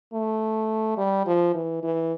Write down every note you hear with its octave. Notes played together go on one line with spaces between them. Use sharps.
A3
G3
F3
E3
E3